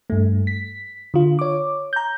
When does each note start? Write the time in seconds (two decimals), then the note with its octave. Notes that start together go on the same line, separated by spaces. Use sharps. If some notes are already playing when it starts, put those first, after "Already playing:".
0.10 G2 A3
0.47 B6
1.14 D3 F4
1.39 C#5 D6
1.93 A#5 G6